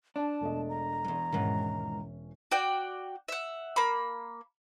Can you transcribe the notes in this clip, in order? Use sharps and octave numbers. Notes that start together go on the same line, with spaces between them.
D4 A5
E1 A3 D#5
A#5
E2 G#2
E1 G#2 D#3 E3 C#4
F#4 D5 G5
E5 F#5
A#3 B5